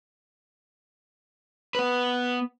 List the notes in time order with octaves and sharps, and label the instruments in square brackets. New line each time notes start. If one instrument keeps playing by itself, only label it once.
[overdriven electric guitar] B3 B4